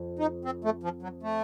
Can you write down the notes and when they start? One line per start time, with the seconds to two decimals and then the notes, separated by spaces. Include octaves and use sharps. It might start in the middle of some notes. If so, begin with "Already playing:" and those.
Already playing: F2
0.19 D#4
0.45 C4
0.64 A3
0.83 F3
1.02 F#3
1.23 A3